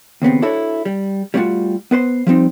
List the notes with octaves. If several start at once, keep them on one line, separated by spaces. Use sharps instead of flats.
D#2 C#3 B3 C4
D4 E4 F#4 A4 C#5
G3
G3 A3 C#4 D#4 F4 F#4
B3 B4 C5 C6
F3 G3 C4 D#4